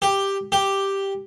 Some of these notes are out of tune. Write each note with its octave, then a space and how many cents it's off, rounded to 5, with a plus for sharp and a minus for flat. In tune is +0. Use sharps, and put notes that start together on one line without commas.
G4 +5
G4 +0